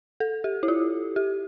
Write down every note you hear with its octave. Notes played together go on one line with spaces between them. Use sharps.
A4
G4
E4
F4
G4